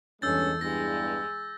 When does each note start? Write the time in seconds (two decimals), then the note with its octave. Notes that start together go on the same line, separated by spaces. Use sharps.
0.22 E2 G2 G#3 C#4 A4 E6 G6 A6
0.61 E2 G2 G#3 A#6